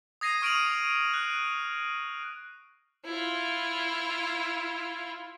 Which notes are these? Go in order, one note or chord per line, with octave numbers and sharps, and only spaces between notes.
D#6 G#6 A#6 C7 D#7
C#6 F6 D7 D#7 F7 F#7
F#6
E4 F4